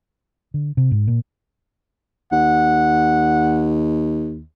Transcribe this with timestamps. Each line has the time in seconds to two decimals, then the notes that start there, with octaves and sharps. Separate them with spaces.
0.54 D3
0.77 C3
0.91 G#2
1.08 A#2
2.32 D#2 F#5